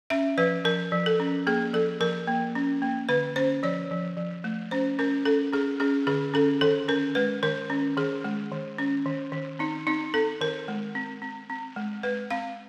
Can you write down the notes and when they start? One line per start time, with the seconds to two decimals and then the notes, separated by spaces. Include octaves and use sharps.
0.10 C#4 E5
0.38 F3 B4
0.65 F3 A#4
0.92 F3
1.06 A4
1.20 C#4
1.47 A#3 G#4
1.73 F3 A4
2.00 F3 A#4
2.27 A#3
2.55 C#4
2.82 A#3
3.09 D3 B4
3.36 C#4 C5
3.63 F3 C#5
3.91 F3
4.17 F3
4.44 A3
4.71 C#4 C5
4.99 C#4 A#4
5.25 C#4 A4
5.53 C#4 G#4
5.80 C#4 G#4
6.07 D3 G#4
6.34 C#4 A4
6.61 D#3 A4
6.88 C#4 A#4
7.15 G#3 B4
7.43 D#3 A#4
7.70 C#4
7.97 D#3 G#4
8.24 G#3
8.51 D#3
8.78 C#4
9.06 D#3
9.32 D#3
9.59 C4 D#4
9.87 C4 D#4
10.14 C4 A4
10.41 D#3 A#4
10.68 G#3
10.95 C4
11.22 C4
11.50 C4
11.76 G#3
12.03 G#3 B4
12.30 C4 F5